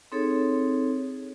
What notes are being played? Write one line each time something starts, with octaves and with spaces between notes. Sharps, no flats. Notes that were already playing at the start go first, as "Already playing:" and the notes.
C4 D#4 G#4 A4 C#5